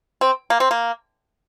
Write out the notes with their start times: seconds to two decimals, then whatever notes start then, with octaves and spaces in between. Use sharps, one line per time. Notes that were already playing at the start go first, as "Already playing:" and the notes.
0.21 C4
0.50 A#3
0.60 C4
0.71 A#3